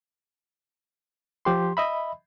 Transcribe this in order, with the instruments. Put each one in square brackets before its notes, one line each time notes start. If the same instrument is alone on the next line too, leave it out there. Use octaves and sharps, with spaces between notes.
[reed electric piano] F3 G4 C6
D#5 E5 B5